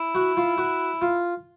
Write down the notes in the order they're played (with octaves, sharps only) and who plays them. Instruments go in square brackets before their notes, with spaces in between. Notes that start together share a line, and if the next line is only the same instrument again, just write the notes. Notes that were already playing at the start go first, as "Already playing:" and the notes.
Already playing: [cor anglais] E4
[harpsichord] F#4
F4
F#4
F4